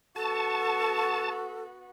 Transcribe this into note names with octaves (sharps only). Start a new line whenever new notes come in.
B3 F#4 A4 A5 C#6